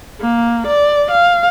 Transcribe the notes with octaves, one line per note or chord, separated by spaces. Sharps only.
A#3
D5
F5